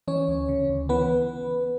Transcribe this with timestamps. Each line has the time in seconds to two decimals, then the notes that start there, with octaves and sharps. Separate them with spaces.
0.08 E3 C#4 C#5
0.28 D2
0.49 C#3
0.69 D2
0.89 E3 B3 B4